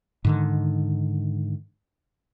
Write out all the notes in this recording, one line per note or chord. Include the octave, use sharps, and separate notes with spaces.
G#2 D3 D#3